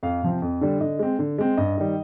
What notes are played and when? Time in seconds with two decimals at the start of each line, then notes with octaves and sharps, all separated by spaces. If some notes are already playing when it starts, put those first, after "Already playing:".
0.03 F2 F5
0.22 C3 F3 C4
0.42 F2
0.61 D3 G3
0.81 D3 D#5
0.99 G#3 C4
1.19 D3
1.38 G#3 C4
1.57 G2 D#5
1.78 D#3 G3